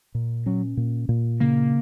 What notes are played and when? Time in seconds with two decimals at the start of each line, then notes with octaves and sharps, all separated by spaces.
0.15 A#2
0.46 F#3 C#4
0.77 A#2
1.09 A#2
1.40 C#3 A#3